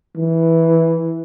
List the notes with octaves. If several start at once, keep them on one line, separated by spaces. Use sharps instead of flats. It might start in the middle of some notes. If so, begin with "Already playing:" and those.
E3